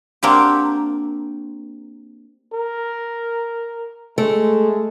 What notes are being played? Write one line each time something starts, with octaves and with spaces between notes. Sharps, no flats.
A#3 C4 D4 F#4 G4
A#4
G#3 A3